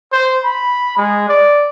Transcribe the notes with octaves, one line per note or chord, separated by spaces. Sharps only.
C5
B5
G#3
D5